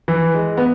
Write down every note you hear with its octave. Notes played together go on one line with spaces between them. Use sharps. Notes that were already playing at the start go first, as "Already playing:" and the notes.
E3
G#3
B3